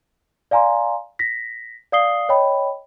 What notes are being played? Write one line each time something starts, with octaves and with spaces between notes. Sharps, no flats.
D5 F5 G#5 A#5 C6
A#6 B6
D5 F5 D#6 C7 G7
C#5 D#5 G5 B5